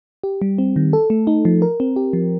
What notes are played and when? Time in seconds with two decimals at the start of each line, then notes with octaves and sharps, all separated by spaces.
0.24 G4
0.42 G3
0.58 C4
0.76 D#3
0.93 A4
1.10 A3
1.27 D#4
1.45 F3
1.62 A#4
1.80 C4
1.96 G4
2.13 F3